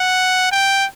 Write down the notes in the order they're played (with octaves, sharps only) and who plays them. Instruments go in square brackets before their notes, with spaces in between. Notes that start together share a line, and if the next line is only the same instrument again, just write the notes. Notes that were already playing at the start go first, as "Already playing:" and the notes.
Already playing: [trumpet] F#5
G5